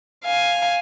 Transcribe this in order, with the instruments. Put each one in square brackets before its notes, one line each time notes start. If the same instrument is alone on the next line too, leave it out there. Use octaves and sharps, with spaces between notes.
[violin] F5 G#5